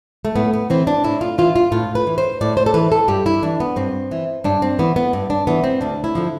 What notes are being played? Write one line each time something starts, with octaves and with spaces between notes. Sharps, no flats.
A3
A2 B3
B3
E3 C4
D4
A2 E4
F4
E3 F4
F4
A2 F4
B4
E3
C5
A2 D5
C5
A4
E3 B4
A4
G2 G4
E4
E3 D4
B3
G2 C4
E3
G2 D4
C4
E3 B3
B3
G2
D4
E3 B3
C4
D2 D4
E4
D3 F3